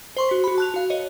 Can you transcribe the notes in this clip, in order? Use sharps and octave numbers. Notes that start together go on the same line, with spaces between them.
C5 C6 C#6
F#4 B6
F#4 B5
A5 F#6 F7
F#4 F5
C#5 D#5